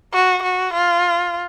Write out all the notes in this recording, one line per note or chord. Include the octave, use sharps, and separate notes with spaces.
F#4
F#4
F4